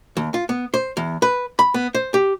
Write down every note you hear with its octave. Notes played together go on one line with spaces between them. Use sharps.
D#2
F4
B3
C5
E2
B4
B5
B3
C5
G4